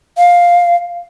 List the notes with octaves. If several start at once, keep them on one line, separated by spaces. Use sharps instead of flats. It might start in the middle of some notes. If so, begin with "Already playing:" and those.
F5